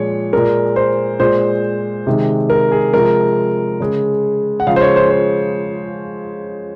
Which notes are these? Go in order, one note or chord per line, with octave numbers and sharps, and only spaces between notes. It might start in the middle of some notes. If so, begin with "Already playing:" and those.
Already playing: A#2 F3 G#3 C#5
A#2 G#3 A#4
C5
A#2 G#3 C5
C3 D#3 G#3
A#4
G#4
C3 F3 G#3 A#4
C#3 G#3
F#5
C#3 F3 G#3 F5
C5
C#5
C5
C5